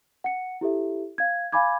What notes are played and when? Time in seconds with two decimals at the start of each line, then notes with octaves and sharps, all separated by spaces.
0.24 F#5 C#7
0.61 E4 G4 A4 E5
1.18 F5 G#6
1.52 F5 G#5 B5 D6 G#6